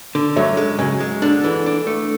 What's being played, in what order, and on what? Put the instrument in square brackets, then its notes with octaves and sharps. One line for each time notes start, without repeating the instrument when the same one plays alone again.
[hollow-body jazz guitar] D3
[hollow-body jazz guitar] F#2 [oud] F#3 A3
[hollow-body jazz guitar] G#3
[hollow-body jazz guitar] F#2 [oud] C#3
[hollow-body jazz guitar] G#3
[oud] D3 [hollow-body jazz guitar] D4
[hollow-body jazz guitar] E3
D4
A3